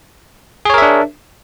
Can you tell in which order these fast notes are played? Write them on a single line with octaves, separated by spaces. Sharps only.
G#4 C#5 A#4 E5 D4